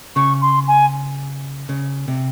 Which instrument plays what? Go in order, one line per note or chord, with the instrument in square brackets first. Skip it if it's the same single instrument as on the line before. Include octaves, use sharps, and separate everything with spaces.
[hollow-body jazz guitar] C#3 [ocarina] C#6
[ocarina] C6
G#5
[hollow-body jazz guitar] C#3
C3